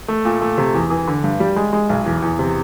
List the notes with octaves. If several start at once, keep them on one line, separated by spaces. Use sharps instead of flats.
A3
A#2
A3
C3
E2
E3
D3
G2
G3
G#3
G#3
B1
E2
E2
C3